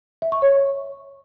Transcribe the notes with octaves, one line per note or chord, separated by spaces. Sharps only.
E5
C#6
C#5